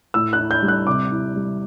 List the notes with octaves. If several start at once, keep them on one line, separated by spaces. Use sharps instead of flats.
A2 E6
F#6
E4
G6
G3
F#6
C3 D6
E4
G3